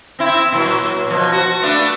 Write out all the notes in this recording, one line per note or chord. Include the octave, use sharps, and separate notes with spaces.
C4 E4
A#2 F#3
B2 F3
F#4
A3 B3 D4